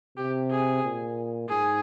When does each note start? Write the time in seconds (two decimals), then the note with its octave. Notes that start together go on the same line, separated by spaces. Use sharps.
0.17 C3 G4
0.51 G#4
0.84 A#2
1.49 G#2 G#4